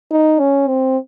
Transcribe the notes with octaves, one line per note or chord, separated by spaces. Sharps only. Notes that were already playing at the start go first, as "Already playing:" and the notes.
D#4
C#4
C4